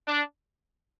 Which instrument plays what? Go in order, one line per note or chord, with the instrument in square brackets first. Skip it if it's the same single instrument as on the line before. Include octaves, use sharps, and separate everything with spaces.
[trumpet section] D4